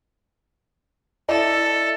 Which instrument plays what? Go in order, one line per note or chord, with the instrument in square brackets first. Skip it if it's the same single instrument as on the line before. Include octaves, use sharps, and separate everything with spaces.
[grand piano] E4 D5 D#5 [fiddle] A4